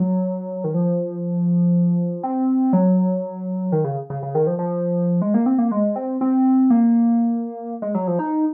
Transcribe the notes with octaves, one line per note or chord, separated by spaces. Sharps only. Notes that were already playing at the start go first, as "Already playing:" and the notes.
Already playing: F#3
D#3
F3
C4
F#3
D#3
C#3
C#3
C#3
D#3
F3
F3
G#3
A#3
C4
A#3
G#3
C4
C4
A#3
G#3
F#3
F3
D#4